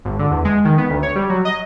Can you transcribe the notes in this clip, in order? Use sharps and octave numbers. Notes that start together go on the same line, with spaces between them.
G#1
D3
E2
G#3
D#3
B3
D2
C#5
G3
F#3
D#5